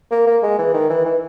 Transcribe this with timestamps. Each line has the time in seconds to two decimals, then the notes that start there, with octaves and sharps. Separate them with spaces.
0.11 A#3
0.27 A#3
0.43 G#3
0.59 E3
0.74 D#3
0.90 E3
1.05 E3